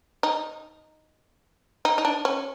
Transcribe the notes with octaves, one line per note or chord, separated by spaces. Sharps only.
D#4
D#4
D#4
D4
C#4